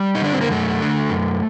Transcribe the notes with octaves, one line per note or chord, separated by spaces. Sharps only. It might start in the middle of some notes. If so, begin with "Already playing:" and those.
Already playing: G3
D#4
D3 D4
C4
A#3
F#2 A3
D3
F#2